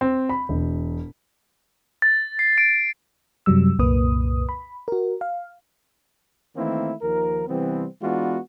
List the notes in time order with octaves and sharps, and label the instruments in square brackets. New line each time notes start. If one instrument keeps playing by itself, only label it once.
[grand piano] C4
B5
E1
[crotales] A6
C7
D7
[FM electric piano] F#2 C3 F#3 G3 E6
C2 F#2 A#2 A#3 B4 D#6
B5
F#4 A#4
F5
[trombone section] D#3 E3 A3 A#3 C4 E4
D#2 D#3 F3 A#4
C3 E3 G3 B3 C4
E3 G#3 B3 D4 F4 F#4